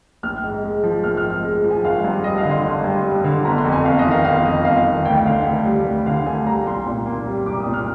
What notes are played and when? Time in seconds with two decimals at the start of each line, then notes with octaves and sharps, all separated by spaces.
0.23 A#1 F6
0.44 G#2
0.63 G#3
0.83 F3
1.04 A#1 F6
1.17 F6
1.24 G#2
1.30 F6
1.44 G#3
1.64 F3
1.71 G#5
1.84 G#1 F5
2.04 G2
2.24 G3 D#5
2.38 F5
2.45 D3
2.51 C6
2.65 G#1
2.84 G2
3.04 G3
3.24 D3
3.45 G1 A#5
3.58 C6
3.65 F2
3.72 G#5
3.85 G1 F5
3.99 D#5
4.05 D#3
4.11 F5
4.25 G1 F5
4.45 F2 D#5
4.65 G1 F5
4.86 D#3
5.05 D2 G5
5.26 D3 F5
5.46 D2
5.65 G3
5.86 D2
6.06 D3 F5
6.26 D2 G#5
6.46 G3 A#5
6.66 C2 C6
6.86 A#2
7.06 A#3
7.27 G3
7.46 C2 D6
7.60 D#6
7.67 A#2
7.74 F6